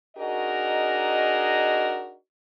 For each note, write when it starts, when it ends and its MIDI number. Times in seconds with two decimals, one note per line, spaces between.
0.17 2.14 62
0.17 2.14 63
0.17 2.14 66
0.17 2.14 68
0.17 2.14 70
0.17 2.14 75